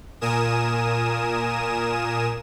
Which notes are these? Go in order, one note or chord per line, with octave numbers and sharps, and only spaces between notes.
A#2 A#4 G#5 D#6 E7